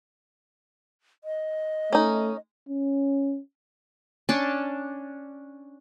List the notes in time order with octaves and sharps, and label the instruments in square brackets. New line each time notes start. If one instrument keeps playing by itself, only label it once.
[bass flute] D#5
[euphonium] A3 [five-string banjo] C#4 D#4
[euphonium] C#4
[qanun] C#4 D4 A5